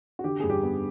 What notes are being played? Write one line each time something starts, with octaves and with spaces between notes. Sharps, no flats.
F#4
D3 G4
G2 G#4
G4
B3